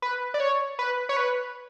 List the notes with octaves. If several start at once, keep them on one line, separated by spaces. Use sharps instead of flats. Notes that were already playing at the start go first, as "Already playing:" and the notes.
B4
D5
C#5
B4
C#5
B4